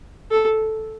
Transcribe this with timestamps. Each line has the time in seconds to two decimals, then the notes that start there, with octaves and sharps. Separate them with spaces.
0.31 A4